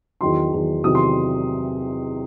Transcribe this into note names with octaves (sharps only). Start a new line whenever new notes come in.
E2 D#3 F#3 C6
E2 D#3 F#3
E2 C3 D#3 F#3 D#6
C6